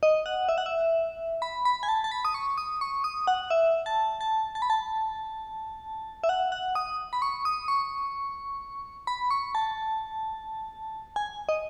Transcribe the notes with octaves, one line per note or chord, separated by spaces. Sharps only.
D#5
F#5
E5
F#5
E5
B5
B5
G#5
A5
A5
B5
D#6
C#6
D#6
C#6
D#6
F#5
E5
A5
A5
A5
B5
A5
E5
F#5
F#5
D#6
B5
C#6
D#6
C#6
B5
C#6
A5
G#5
D#5